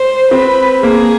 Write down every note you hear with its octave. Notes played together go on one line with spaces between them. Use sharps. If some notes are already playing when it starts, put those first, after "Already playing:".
Already playing: C5
C4 B4
A#3 G#4